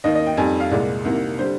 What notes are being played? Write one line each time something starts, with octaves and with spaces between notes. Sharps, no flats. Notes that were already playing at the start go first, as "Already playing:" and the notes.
D#2 D#3 A#3 D#5
D#5
G5
F2 D#3 G3 G#5
F5
C2 A#2 G#3 D5
C2 C3 D#3 A#3
D3 G3 C5